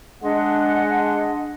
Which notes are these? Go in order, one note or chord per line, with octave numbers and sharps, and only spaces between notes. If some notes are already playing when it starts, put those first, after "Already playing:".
G#3 D4 D#5 F#5